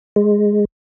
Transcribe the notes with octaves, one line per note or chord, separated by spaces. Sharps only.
G#3